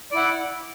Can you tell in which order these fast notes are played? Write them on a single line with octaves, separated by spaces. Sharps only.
D5 E4 F#5